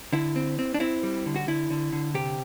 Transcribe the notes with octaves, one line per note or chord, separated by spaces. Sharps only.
D3 E4
C4
C4
D4
C4 E4
G3
D3
F#4
D3 E4
D3
D3
C3 G4